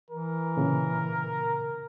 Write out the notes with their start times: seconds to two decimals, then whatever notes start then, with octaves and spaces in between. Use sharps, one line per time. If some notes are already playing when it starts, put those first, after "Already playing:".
0.11 E3 A#4
0.57 A#2 C#3